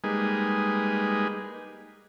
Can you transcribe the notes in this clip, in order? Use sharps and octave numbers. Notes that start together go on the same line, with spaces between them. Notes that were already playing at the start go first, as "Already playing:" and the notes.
G3 G#3 A#3 D#4 G#4 B4